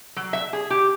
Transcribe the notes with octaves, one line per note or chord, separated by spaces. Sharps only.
F#3
E5
G#4
G4